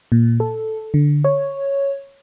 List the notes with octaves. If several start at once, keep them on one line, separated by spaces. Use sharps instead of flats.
A#2
A4
D3
C#5